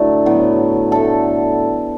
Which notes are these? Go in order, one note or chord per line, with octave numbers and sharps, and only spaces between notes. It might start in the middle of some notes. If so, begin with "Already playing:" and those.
Already playing: A2 D3 F#3 A3
A2 F#3 B3
D3 A3 A4